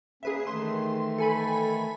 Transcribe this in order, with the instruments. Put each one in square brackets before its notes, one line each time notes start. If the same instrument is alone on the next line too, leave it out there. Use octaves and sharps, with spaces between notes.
[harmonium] A#3 C#4 [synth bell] G#4 B4 E5
[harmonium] D#3 E3 A3 [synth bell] C6
[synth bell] A4 G#5 B5